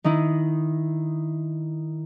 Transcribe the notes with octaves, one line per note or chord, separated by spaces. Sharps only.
D#3 D#4 E4